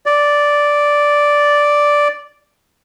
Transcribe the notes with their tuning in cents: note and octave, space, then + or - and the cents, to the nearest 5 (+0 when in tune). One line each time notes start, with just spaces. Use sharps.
D5 -5